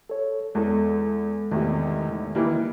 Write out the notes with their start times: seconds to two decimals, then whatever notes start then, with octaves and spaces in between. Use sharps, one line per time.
0.10 A4 C#5
0.55 E2 G#3 A4
1.51 E2 A2 C3 D#3
2.35 D#3 E3 G3 A#3